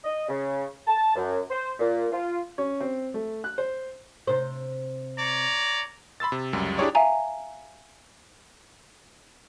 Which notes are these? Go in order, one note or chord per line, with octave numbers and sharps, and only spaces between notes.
D#5
C#3
A5
F#2
C5
A#2
F4
C#4
C4
A3
F#6
C5
C3 C5
C#5 D5 A#5
B5 C6 E6 A6
C3
C#2 F#2 G3
D4 E4 G4 G#4 C#5 D5
E5 F5 G#5 A#5